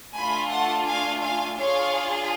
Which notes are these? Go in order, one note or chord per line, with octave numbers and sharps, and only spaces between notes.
A3 D4 F4 G#5 B5
F#5 A5
F5 G#5
F5 G#5
D4 F4 G#4 C#5 F5